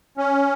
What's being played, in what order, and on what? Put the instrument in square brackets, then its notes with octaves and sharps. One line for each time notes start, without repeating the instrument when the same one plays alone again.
[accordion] C#4